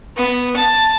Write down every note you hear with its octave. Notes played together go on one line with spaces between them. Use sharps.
B3
A5